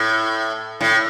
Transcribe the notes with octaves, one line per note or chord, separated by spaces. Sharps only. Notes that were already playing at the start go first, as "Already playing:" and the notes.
Already playing: A2
A2